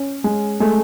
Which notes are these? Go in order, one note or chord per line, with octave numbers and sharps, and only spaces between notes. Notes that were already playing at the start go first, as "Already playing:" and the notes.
Already playing: C#4
G#3
G#3 A3